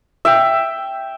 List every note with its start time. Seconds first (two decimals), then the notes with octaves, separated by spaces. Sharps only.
0.25 E5 G5